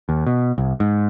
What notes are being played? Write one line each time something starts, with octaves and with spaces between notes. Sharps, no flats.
D#2
B2
C2
G#2